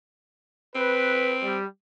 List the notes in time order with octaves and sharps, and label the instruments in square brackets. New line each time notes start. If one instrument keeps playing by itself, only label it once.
[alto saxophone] C4 [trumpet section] B4
[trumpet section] G3